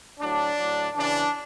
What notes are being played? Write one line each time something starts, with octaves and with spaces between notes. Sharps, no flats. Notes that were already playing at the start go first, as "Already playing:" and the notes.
A2 F#3 D4
A2 F#3
C#3 E3 D4